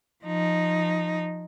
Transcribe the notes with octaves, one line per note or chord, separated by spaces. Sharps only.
F3 D#4